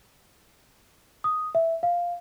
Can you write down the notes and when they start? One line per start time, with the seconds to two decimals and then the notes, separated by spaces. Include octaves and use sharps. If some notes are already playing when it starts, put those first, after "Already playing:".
1.24 D#6
1.55 E5
1.83 F5